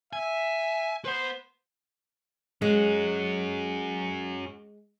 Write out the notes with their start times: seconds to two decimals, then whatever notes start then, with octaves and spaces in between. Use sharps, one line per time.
0.13 E5 G#5
1.05 B4 C5 F#5
2.62 G#3 C#4 F#4 G#4